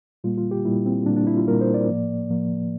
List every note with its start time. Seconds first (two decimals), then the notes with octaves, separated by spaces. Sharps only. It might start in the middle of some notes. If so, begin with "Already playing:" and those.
0.24 A#2 G3 A#3 F4
0.38 F4
0.51 G4
0.65 A#2 G3 A#3 E4
0.86 C4
1.06 A#2 G3 A#3 D4
1.16 D4
1.27 E4
1.37 F4
1.47 A#2 G3 A#3 A#4
1.61 C5
1.74 D5
1.88 A2 F3 A#3
2.29 A2 F3 A#3